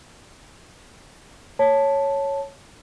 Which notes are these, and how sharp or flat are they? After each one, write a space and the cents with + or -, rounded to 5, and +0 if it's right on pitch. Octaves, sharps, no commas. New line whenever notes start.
C#5 +0 A5 +0